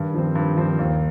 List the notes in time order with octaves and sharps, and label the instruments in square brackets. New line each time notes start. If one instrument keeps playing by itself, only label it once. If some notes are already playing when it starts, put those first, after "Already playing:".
Already playing: [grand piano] G2 [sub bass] D#3
[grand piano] F3 C4
G2
F3 C4
D#2